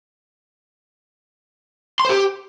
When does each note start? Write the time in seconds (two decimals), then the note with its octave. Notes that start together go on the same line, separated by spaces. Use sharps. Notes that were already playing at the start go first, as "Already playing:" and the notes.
2.00 C6
2.05 C5
2.10 G4